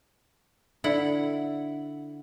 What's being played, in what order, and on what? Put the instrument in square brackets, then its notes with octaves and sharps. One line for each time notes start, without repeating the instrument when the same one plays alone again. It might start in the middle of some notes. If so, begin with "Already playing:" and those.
[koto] D3 E4 F#5